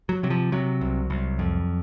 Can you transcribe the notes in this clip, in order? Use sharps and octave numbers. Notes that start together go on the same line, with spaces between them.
F#3
C3 F#3
F3
C3 F#3
C2
C2
F2